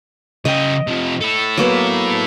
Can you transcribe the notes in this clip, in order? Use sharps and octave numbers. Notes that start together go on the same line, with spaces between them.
C#3 D#5 G5
C3 F3
E4 A4
F#3 A#3 B3